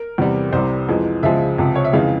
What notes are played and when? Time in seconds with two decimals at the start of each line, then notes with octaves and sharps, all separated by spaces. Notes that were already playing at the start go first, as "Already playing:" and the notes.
Already playing: A#4
0.18 E2 C3 G3
0.52 C2 C3 G3 C5
0.89 F2 E3 G#3
1.23 C#2 C#3 F3 G#3 E5
1.58 C#2 C3 F3
1.75 C#5
1.84 E5
1.93 F2 C#3 E3 G#3 F5